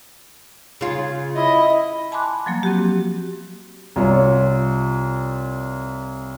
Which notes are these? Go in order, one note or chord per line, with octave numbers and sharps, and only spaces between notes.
C#3 F4
E4 D#5
G#5 A5 B5 C6 D6 F#6
F3 F#3 A#3
C4 F#4 G4
C2 F4 C#5